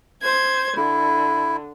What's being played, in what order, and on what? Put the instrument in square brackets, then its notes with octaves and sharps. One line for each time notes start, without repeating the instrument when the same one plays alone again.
[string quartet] C5 G#6
[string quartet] D3 [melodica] E4